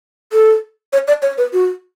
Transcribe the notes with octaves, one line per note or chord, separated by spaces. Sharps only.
A4
C#5
D5
C#5
B4
F#4